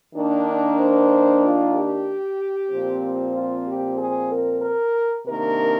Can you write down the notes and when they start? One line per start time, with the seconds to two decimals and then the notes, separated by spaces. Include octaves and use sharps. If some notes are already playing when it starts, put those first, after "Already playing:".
0.14 D#3 A#3 D4
0.79 C5
1.43 F4
1.75 G4
2.70 A#2 F3 C4
3.35 F4
3.66 G4
3.98 G#4
4.30 A#4
4.63 A#4
5.26 C3 D#3 A#3 D4 A#4